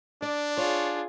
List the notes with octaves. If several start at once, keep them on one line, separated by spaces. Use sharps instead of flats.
D4 D5
F4 G#4 C#5